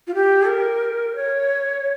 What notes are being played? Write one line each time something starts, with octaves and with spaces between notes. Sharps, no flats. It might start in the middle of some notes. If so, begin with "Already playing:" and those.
F4
G4
A#4
C#5